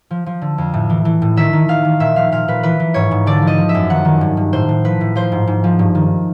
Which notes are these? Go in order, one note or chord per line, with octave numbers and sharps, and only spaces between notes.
F3
F3
D3
F2
A2
E3
E3
A2
D#3 E5
D#3
D#3 F5
D#3
A#2 E5
F3 F5
A#2 F5
A#2 B4
E3 B4
E3
G#2 C#5
G#2
D3 D5
F3
D#5
F3
E5
F#2
D#3 F#5
D#3
G2
G2
A2 C5
A2
F3 B4
A2
F3 C5
G#2
G#2
F3
G2
D#3